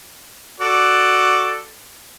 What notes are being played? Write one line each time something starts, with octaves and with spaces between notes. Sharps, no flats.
F#4 A4 D5